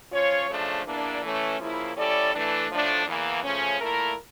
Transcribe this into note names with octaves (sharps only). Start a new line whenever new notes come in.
F3 C#4 F4 C#5
C#3 F3 A3 D4
E2 E3 A#3 D4
E3 A3 C#4
C#3 F3 A#3 E4
G3 C#4 E4 A4 D5
E3 A3 D4
A2 F3 A3 D4
E2 E3 A#3
C#3 F3 A3 C#4
A#2 A3 E4 A#4